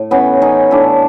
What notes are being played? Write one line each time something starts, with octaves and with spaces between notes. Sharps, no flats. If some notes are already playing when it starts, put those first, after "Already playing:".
Already playing: A2
E3 B3 C#4
E3 C#4 D#4
A2 D4 E4